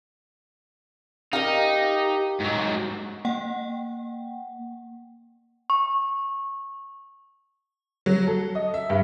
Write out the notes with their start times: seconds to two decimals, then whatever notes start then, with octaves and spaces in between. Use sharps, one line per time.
1.33 D#4 G4 A#4 F5
2.40 G#2 F#3
3.25 A#3 F#5 G5
5.70 C#6
8.06 F#3
8.27 A4
8.55 D#5
8.74 E5
8.90 G2